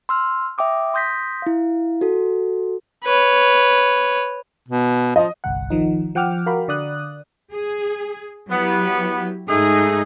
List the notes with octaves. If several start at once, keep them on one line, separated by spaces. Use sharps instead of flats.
C6 E6 F6
E5 G5 D6 D#6
C6 D#6 G6 A#6 B6
E4 F5
F#4 A4
B4 C#5
B2
F3 D#5
G1 C2 F#5
D#3 F3 D#4
F3 F#5 G5 D6 F6
F#4 A#4 F5 B5
D3 D5 D#6 F#6
G#4
F#3 B3 E4 G4
G#2 A3 D#4 G#4